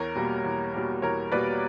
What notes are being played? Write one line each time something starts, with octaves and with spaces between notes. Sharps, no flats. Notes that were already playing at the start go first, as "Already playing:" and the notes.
Already playing: E2 A#4 C#5
B2 G3 A#3
E2
B2 G3 A#3
E2 A#4 C#5
B2 G3 A#3 B4 D5